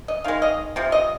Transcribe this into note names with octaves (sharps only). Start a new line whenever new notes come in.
D#5
D#3 G#3 F5
D#5
C3 F3
D#5